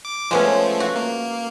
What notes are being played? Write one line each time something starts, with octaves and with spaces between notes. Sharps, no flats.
D6
F3 G#3 A3 B3 C#4
F#4
A#3